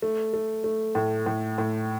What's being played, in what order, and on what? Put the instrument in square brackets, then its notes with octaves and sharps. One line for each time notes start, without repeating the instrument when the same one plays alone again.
[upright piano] A3
A3
A3
A2
A2
A2